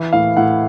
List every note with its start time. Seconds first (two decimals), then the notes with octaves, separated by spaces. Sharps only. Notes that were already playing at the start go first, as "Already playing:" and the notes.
Already playing: E3
0.13 A2 F5
0.37 A2 F#5